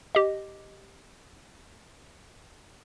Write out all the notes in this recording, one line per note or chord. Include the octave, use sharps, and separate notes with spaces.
G4 D#5